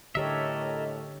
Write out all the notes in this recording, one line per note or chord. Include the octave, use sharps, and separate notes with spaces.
A2 D3 G4 A4 A#4 C#5 D#5 E5